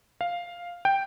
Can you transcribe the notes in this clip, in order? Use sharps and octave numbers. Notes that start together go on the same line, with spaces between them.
F5
G5